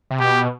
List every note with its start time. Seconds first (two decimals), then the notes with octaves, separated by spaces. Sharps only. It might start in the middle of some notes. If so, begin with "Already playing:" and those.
0.11 C3
0.20 B2 G4